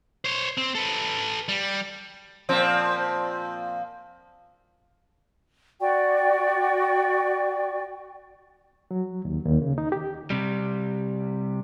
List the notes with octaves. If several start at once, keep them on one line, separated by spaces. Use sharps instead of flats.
C5 C#5
C4
A4 B4
G3
A#2 F3 C4
F#4 D5 G5 C#6
F#3
D#2
D#2
C#3
D#4
G4
C3 G3